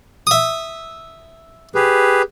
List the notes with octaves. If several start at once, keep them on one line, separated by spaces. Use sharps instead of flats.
E5 D#6
G4 G#4 B4